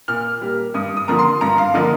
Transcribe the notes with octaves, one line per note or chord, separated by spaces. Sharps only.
A#2 F6
G3 A#3
G2 D#6
D#6
D3 F3 A#3 A#5
C6
G2 A#5
F5
D3 F3 A#3 D#5